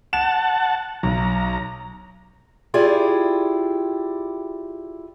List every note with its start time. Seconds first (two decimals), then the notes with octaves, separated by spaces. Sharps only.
0.13 F#5 A5 E7
1.03 B1 A#5
2.74 E4 F4 G4 G#4 D5